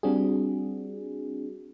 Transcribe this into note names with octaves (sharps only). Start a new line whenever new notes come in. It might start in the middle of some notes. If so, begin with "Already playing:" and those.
G3 C4 D4 F#4 G#4